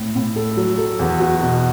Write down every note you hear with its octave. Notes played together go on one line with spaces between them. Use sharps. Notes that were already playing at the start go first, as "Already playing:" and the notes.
Already playing: A2
A2
A4
F#3
A4
E2
F#4
B2